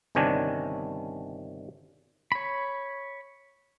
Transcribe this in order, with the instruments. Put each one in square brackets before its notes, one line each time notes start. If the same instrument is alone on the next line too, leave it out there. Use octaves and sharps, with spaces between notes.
[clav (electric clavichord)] G1 C3 D#3 C#4 D4 G#5
[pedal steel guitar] C#5 B5